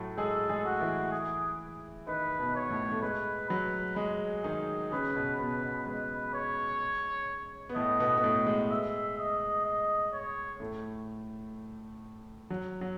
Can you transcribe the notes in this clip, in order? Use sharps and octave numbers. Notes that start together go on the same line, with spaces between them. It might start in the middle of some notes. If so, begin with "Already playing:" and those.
Already playing: A2 F#3 A3
G#3 G#4 A4
G#3 G#4
F#4
E3 E4
G#4
D#3 D#4 B4
B2 B3
C#5
A2 A3
A3
G#3 B4
F#3 B4
G#3 G#4
D#3 D#4 G#4
C#3 C#4 B4
B2 B3
B2 B3 B4
B2 B3
G#3 B4
C#5
B3
A2 A3 D#5
B2 B3
B3
A2 A3
G#3
E5
D#5
D#5
C#5
A2 A3
F#3
F#3